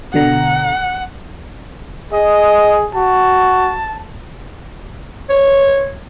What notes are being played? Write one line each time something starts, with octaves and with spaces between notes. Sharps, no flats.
B2 D3 F#5 A#5
G#4 D#5
F#4 A5
C#5